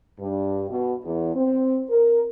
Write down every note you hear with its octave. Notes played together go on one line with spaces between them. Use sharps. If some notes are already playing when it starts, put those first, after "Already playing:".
G2
B2
E2
C4
A#4